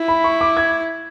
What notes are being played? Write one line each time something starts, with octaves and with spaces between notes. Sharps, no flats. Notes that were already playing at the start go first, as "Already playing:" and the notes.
Already playing: E4
B5
C#6
D6
G#6